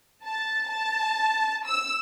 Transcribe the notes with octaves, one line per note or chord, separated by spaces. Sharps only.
A5
A5
E6